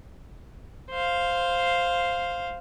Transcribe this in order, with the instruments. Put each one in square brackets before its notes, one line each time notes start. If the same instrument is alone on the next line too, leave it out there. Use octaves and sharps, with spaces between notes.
[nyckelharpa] C5 F5